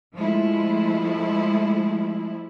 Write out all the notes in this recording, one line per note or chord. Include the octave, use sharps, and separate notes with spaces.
F3 G#3 A3 E4